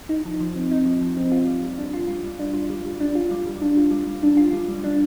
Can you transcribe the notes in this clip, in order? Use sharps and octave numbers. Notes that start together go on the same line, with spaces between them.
D#4
F3
F3
C4
D#4
F3
F3
C4
F4
G3
G3
D4
F4
G3
G3
D4
F4
G3
G3
D4
F4
G3
G3
D4
F4
G3
G3
D4
F4
G3
G3
D4